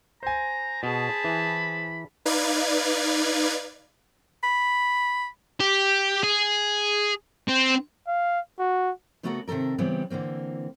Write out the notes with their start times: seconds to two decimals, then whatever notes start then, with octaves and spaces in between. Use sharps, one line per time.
0.23 C5 G#5 A#5
0.83 B2 G#4 A5 B5
1.24 E3
2.25 D#4 B4 D5 F5 G#6
4.44 B5
5.60 G4
6.24 G#4
7.49 C4
8.08 F5
8.59 F#4
9.23 C#3 A3 B3 F#4 A4 A#4
9.48 C3 D#3 F3 A4 A#4
9.78 C#3 E3 G3 B3 C4
10.10 D3 E3 A#3 C4